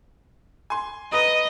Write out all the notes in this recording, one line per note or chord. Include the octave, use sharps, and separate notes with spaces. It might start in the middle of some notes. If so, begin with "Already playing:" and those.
G#5 C6
B4 D#5 A#5 D#6